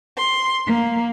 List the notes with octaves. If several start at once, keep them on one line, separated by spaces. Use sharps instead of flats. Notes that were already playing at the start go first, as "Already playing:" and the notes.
C6
A#3